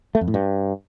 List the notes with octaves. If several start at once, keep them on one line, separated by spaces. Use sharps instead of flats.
A3
F2
A2
G2